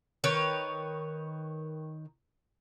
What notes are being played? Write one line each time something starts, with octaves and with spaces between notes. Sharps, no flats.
D#3 B4 C#5